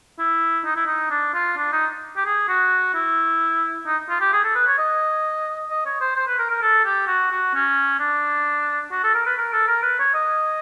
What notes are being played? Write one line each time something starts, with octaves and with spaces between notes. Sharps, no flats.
E4
D#4
E4
D#4
D4
F4
D4
D#4
G4
G#4
F#4
E4
D#4
F4
G4
G#4
A4
B4
C#5
D#5
D#5
C#5
C5
C5
B4
A#4
A#4
A4
G4
F#4
F#4
C#4
D4
F#4
A4
A#4
B4
A#4
A4
A#4
B4
C#5
D#5